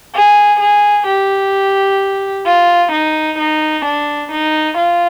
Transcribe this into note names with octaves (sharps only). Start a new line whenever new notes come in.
G#4
G#4
G4
F4
D#4
D#4
D4
D#4
F4